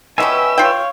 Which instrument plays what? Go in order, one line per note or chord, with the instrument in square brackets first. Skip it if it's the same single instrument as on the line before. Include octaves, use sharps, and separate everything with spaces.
[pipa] B2 F3 C#4 [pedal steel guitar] B4 E5 G#5 [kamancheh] G5 [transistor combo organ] E6
[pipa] F4 G5 [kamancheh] C#5 F5